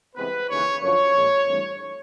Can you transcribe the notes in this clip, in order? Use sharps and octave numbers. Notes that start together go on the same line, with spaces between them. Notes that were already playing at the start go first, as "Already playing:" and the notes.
C2 C3 E3 G#3 B3 B4
D#2 C#3 E3 C#5
F#2 D3 F3 C#5
A#2 F3 G#3
G2 E3 A3 C4